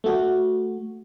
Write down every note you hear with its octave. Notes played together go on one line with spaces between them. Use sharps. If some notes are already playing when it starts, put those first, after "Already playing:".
A3 F#4